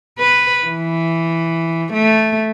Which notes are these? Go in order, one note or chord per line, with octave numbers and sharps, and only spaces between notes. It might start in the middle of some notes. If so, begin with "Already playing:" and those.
B4
E3
A3